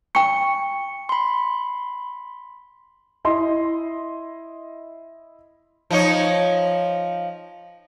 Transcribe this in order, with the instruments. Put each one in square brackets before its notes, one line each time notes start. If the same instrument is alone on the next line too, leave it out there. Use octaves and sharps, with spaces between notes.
[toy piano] G5 C#6 [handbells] C#7
[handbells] B5 C6
[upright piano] E4 D#5 C6
[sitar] F3 D#4 C#5